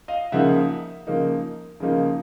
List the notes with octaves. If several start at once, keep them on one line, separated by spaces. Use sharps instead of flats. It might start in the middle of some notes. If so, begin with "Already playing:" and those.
D#5 F5
C#3 F3 A#3 D#4 E5 F#5
C#3 F3 A#3 D#4
C#3 F3 A#3 D#4